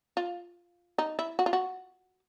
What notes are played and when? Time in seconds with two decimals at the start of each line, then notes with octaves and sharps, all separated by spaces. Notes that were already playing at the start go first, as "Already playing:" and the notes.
0.17 F4
0.98 D#4
1.19 E4
1.39 F#4
1.46 F4
1.53 F#4